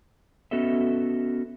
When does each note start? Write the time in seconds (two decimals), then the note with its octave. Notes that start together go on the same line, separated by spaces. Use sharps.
0.51 B3 C#4 F#4 A4 D#5 E5